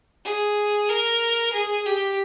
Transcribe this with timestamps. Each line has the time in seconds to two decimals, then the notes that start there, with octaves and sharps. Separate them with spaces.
0.25 G#4
0.89 A#4
1.53 G#4
1.86 G4